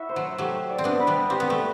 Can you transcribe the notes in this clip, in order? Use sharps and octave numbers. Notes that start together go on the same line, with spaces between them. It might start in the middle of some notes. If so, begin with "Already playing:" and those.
Already playing: E4 F#4 E5
C5
F#3
F#3 A3 G4
D5
C4
B3 D4
B4
G3 B3
C4 G4
B3
A3